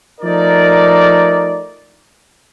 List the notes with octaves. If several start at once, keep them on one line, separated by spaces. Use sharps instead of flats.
F3 A3 D#4 A#4 D5